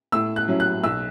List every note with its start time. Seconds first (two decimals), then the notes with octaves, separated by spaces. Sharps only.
0.12 A2 E6
0.36 F#6
0.48 F#3 C#4 E4
0.60 F#6
0.84 B1 E6